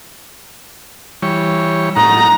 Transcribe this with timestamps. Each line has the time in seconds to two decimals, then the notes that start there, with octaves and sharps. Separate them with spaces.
1.22 E3 G3 C#5
1.96 A2 D#4 F#5 A#5